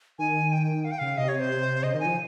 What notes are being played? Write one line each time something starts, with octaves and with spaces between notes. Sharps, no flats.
D#3 G#5
G5
F5
G5
C#3 F5
C3 D#5
C#5
C5
C#3 D#5
D#3
G#5
F3